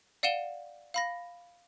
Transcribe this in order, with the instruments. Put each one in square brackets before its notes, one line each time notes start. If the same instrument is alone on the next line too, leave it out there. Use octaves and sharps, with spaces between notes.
[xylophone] D5 F5 F#5 D#7 E7 G7
F5 B5 A#6